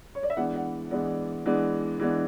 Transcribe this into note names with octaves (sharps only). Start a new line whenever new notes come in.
C#5
D5
E5
E3 G#3 B3 D4 F#5
F#5
E3 G#3 B3 D4 D5
E3 G#3 B3 D4
E3 G#3 B3 D4